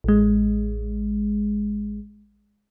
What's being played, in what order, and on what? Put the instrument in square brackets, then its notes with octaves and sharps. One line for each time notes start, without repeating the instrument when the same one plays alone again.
[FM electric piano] A1 G#3